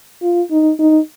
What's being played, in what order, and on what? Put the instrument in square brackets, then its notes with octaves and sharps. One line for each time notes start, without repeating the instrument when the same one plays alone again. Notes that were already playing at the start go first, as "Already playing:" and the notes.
[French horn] F4
D#4
D#4